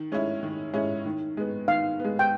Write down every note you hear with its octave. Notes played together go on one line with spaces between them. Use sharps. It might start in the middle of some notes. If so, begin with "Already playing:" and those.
Already playing: D#3
G#3 C#4 E4
D#3
G#3 C#4 E4
D#3
G#3 B3
D#3 F5
G#3 B3
G5